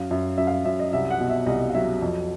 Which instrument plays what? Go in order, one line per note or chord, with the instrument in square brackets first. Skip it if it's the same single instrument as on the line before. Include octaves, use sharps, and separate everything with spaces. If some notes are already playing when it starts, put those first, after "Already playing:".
Already playing: [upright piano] F#2 F5
F#2 E5
F#2 E5
F5
E5
F#2 E5
D#5
C2 E5
F#5
B2
E5
C2 D#5
F5
F#3 E5
F2